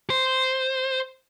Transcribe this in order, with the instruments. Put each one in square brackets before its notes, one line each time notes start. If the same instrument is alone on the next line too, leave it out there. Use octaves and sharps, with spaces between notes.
[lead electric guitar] C5